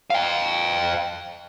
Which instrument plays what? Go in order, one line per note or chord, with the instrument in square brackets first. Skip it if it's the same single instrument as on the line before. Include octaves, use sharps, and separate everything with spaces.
[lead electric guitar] F5 G5